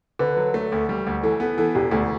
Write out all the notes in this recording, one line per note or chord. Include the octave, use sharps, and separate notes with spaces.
D3 B4
F#3
A3
D2
G3
D2
E3 A4
B3 A4
E3 A4
E1 G4
D2 A3